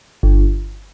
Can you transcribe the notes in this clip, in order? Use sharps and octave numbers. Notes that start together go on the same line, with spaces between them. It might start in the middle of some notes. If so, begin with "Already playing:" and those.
G1